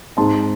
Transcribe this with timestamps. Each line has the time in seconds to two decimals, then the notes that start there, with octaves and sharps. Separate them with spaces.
0.17 G#2 G#3 C4 A5 C6